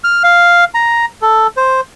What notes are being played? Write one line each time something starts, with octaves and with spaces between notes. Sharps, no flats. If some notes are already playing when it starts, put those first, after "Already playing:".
F6
F5
A#5
A4
C5